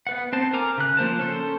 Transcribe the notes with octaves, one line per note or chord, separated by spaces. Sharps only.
B3 B4 F#5
C4 C5 A5
A#4 G#5 A#5 D6
C#3 F#6
F3 A#3 C5 A5
C#4 A4 C5